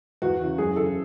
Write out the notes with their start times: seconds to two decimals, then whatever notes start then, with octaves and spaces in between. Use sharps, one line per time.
0.22 E2 F#4
0.40 C#3 E3
0.58 F#2 G#4
0.76 C#3 E3 A4